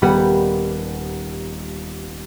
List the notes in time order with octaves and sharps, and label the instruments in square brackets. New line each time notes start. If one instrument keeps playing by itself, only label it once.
[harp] D#1 G3 B3 G4 F#5